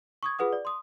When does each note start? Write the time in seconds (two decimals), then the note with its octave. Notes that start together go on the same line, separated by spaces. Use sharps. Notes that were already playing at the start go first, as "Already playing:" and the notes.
0.23 C#6 D#6 G#6
0.39 F4 G#4 B4 F#5 D#6
0.53 D5
0.65 C6 D#6